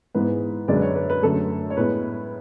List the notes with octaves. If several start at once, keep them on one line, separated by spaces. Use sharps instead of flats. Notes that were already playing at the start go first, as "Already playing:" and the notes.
G#2 E3 G#3 B3 B4
F#2 D3 G#3 D5
B4
C#5
B4
B4
F#2 D3 A3 A4
C#5
A2 G#3 B3 B4